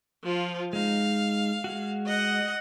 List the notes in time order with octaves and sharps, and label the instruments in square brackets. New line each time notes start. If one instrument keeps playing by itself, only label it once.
[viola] F3 F4
[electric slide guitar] G#3 D#4 [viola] F5
[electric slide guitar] G#3 F#4
[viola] D#5 F#5